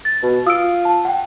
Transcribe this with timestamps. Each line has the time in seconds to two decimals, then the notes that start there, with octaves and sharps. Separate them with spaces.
0.05 A6
0.23 B2
0.47 F4 D#6 E6 D7
0.85 A5
1.05 F#5 G5